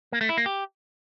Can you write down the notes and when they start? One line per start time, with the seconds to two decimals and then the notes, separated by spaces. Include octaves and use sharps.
0.12 A#3
0.21 A3
0.29 E4
0.37 A#3
0.46 G4